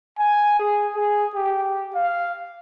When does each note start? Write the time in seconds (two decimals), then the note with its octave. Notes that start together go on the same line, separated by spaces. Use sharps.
0.19 G#5
0.60 G#4
0.96 G#4
1.35 G4
1.95 F5